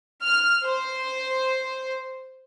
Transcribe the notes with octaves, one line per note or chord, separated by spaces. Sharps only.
F6
C5